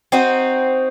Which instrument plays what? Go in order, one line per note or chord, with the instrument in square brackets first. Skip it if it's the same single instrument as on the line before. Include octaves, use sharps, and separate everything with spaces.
[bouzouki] C4 D#4 F#4